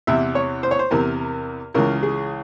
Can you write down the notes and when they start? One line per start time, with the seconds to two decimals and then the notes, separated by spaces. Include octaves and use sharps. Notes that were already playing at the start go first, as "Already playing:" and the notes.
0.07 E2 C3 E3 E5
0.35 C#5
0.63 C5
0.71 C#5
0.79 C5
0.91 E2 C3 E3 A#4
1.74 C#2 C#3 E3 A#4
2.03 G#4